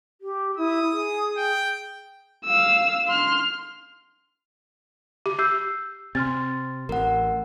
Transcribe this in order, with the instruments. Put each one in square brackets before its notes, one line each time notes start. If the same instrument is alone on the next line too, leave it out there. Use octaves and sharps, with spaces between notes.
[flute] G4
[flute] E4 [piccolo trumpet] D#6
[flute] G#4
[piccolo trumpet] G5
[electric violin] F5 E6
C6 F6
[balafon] G4
[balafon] G4 [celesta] E6 G6 C7
[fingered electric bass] C3 [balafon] C4 [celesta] C6 F6 A6
[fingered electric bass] A1 [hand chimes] A#4 F#5